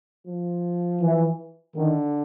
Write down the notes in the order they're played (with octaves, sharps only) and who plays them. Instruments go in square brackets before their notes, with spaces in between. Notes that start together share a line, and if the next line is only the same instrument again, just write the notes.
[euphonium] F3
[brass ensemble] E3
[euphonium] D3 [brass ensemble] D#3